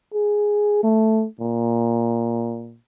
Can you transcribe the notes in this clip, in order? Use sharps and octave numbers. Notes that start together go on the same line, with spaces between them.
G#4
A3
A#2